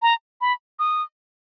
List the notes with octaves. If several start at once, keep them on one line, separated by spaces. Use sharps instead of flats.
A#5
B5
D#6